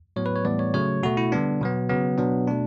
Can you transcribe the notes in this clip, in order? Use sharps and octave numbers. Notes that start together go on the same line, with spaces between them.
A2 F#3 B3 C#5
B4
C#5
A2 E3 G3 B3 D5
C#5
C#3 F#3 A3 C#5
B2 A3 F#4
E4
D3 G3 B3 D4
B2 F#3 B3
C#3 F#3 B3
B2 F#3 B3 D4
B2 A3 D4